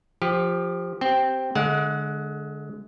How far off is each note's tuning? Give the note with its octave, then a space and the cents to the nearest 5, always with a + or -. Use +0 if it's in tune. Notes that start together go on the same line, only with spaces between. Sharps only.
F3 +0 G4 +15
C4 +0 G4 -20 G5 +0
D3 +0 G#3 +25 F#5 -30